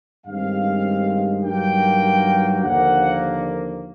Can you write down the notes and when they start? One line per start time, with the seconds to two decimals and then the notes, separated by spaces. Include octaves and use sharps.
0.24 G2 D#3 G#3 C4 F5
1.42 G2 D#3 F#3 A#3 G5
2.60 D#2 D3 F3 A#3 F#5